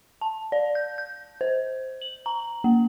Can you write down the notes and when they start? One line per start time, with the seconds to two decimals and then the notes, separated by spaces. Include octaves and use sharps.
0.21 A5
0.52 D5
0.75 G6
0.98 G6
1.41 C5
2.01 F#7
2.26 A#5
2.64 A#3